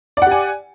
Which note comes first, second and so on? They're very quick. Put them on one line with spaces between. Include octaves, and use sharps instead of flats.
D5 F#5 G4 G#5